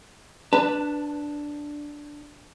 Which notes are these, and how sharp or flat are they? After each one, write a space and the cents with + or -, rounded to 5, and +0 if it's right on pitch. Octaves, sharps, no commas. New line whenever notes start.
D4 +0 B4 +0 A5 +30